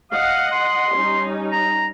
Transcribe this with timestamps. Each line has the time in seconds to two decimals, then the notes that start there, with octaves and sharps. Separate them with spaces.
0.11 D#5 F5 F#5
0.52 C6
0.95 G3 C#4 D#4
1.52 A#5